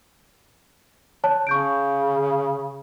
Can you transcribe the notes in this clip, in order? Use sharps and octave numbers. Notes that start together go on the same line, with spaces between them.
C#5 A5 F#6
C#3 C#6 G6 D7